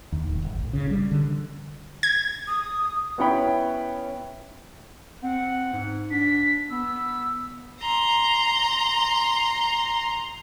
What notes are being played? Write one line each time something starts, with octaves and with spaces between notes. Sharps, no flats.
D#2
D1
G1
A1
C#3
G3
D3
G#6
D#6
B3 C#4 E4 C#5 G5 B5
C4 F#5
G#2
D4 B6
B3 E6
A#5 C6